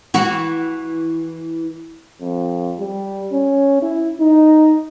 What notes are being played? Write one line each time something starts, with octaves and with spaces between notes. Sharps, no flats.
E3 F#4
F2
G3
C#4
E4
D#4